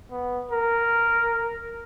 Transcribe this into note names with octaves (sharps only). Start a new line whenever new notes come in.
B3
A#4